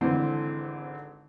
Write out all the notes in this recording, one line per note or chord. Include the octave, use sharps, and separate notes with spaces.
G#1 D3 E3 C4 A4 C6